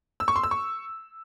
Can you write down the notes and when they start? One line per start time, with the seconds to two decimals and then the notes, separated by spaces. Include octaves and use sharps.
0.20 E6
0.28 C#6
0.36 C6
0.43 E6
0.51 C#6